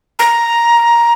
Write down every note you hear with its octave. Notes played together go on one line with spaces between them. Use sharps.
A#5